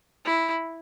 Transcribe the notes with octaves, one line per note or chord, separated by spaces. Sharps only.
E4